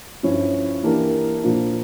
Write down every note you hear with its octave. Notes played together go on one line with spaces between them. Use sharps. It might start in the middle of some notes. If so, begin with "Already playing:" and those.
G2 F3 C#4 E4
E3 A#3 D4 G4 A#4
A#2 F3 A#3 D4